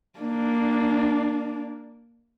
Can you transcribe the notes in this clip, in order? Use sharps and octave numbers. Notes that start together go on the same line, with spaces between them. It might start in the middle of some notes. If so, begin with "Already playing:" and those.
A#3 D4